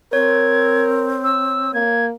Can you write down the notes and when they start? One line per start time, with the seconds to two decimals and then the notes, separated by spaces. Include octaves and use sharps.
0.13 C4 A#4 C#5 G#6
1.24 E6
1.74 A#3 G#6